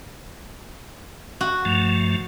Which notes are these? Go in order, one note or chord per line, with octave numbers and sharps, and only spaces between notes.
F#4
G2 F3 A3